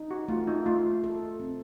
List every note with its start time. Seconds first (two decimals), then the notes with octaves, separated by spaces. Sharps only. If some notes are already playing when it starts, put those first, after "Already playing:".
Already playing: D#4
0.11 F#4
0.28 A3 F4
0.47 D#4
0.66 A3 F4
1.04 A4
1.40 C4